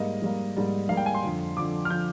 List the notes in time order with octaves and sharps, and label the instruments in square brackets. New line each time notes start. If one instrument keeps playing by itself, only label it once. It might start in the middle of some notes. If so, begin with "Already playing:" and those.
Already playing: [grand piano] G#2 G3 A#3 D#5
G#2 G3 A#3
G#2 G3 A#3
G#2 G3 A#3 F5
G5
G#5
C6
F2 D3 F3
F2 D3 F3 D6
F6
D3 F3 G6